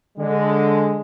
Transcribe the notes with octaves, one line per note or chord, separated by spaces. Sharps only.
D3 G#3